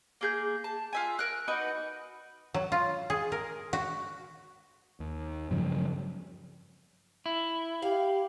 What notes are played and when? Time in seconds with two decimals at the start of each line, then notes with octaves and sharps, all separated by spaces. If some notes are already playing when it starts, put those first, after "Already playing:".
0.21 A#3 G#4 G6
0.64 A5
0.93 F4 E5 G#5
1.19 A#4 F#6
1.48 D#4 F#4 B4 D5
2.54 F#3
2.72 F4
3.10 G#4
3.32 A#4
3.73 F#4
5.00 D#2
5.51 G2 C#3 F3 F#3
7.26 E4
7.82 G4 F5